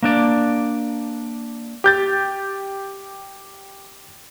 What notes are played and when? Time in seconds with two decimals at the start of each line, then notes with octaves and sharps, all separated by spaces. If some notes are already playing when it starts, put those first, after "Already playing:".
0.03 A#3 D4 D5
1.84 G4 G6 A6